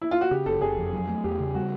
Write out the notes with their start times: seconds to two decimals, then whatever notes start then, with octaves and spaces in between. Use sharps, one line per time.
0.01 E4
0.11 F4
0.21 F#4
0.31 C#3 G4
0.46 F#1 A4
0.61 F#1 G#4
0.78 F2
0.93 F#3
1.09 A3
1.24 E2 G4
1.40 C#3
1.55 G3 F#4